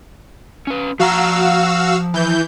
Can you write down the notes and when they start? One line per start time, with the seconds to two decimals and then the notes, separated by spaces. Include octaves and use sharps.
0.67 C#4 B4
0.99 F3 F#4 F5 A#5 E6
2.14 E3 G6